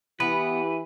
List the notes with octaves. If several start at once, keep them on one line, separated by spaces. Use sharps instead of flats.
E3 B3 E4 G4 B4